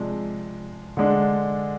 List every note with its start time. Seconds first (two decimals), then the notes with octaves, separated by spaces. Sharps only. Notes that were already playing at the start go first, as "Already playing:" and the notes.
Already playing: C3 F3 G#3 D4
0.97 D3 G#3 D4